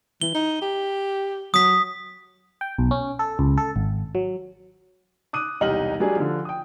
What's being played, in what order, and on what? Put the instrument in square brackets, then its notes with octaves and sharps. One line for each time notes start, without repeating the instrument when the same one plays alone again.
[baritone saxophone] E3 [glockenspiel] G7
[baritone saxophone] D#4
G4
[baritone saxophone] F#3 [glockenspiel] D#6 B6
[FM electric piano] G5
B1
C#4
A4
C#2
A4
G#1
F#3
[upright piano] D6 D#6 F#6 D#7
E1 C2 D#4 G4 F6 F#7
F#3 G3 D4 G#4
D3 F3
G5 D#6